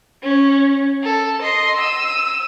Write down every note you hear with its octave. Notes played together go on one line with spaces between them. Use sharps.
C#4
A4
D#5 C6
E6 D#7